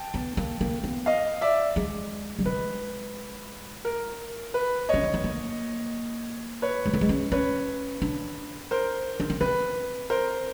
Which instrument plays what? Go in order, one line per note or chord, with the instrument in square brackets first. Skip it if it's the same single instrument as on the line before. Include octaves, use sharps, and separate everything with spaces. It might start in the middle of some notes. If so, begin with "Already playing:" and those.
Already playing: [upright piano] G5 A5
[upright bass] B3
A#3
A#3
B3
[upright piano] D#5 F5
D5 E5
[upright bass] G#3
G3
[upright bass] G#3 [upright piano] B4
[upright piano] A#4
B4
[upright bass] C#4 [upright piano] C#5 D#5
[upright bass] C4
B3
A#3
[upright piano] B4 C#5
[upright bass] G#3
A3
G#3
C#4
[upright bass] C#4 [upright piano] B4 C#5
[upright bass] D4
[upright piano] A#4 C5
[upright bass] D4
C#4
[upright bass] C4 [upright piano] B4
[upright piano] A#4 C5